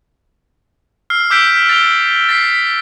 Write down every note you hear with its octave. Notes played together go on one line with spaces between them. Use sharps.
E6 F6 C7
D6 E6 G6 B6 D7
A6 F7 G7
E6 A6 B6 C7